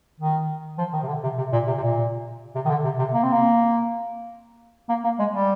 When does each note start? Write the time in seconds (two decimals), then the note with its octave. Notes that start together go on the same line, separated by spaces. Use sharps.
0.20 D#3
0.79 F3
0.93 D#3
1.03 C3
1.08 D3
1.23 C3
1.38 C3
1.52 A#2
1.67 C3
1.78 C3
1.82 A#2
2.55 C3
2.65 D#3
2.70 D3
2.84 C3
2.99 C3
3.14 A#3
3.23 C4
3.32 A#3
4.89 A#3
5.04 A#3
5.19 G#3
5.33 G3